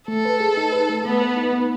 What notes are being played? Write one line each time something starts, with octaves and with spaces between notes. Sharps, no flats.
A3 A4
B4
G#4
D#4
B4
A3
A3 B3
B4
D#4
B3